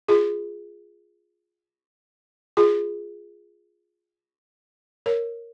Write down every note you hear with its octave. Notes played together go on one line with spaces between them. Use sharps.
F4 G#4
F4 G#4
A#4 C#5